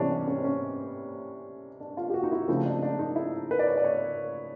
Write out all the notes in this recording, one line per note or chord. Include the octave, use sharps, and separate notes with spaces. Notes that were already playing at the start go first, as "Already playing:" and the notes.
Already playing: C3 E3 G3 B3 C#4 D4
D4
C#4
C4
C#4
D4
F4
G4
F#4
D#4
E4
C#3 F3 A3 C4 D#4
D4
D4
D#4
E4
B4
D5
C#5
D5
C#5